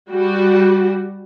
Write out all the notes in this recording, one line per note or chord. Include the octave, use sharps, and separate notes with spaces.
G3 F#4